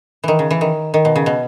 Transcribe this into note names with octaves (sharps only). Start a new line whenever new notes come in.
D#3 E3
C#3
E3
D#3
D#3
B2
C#3
B2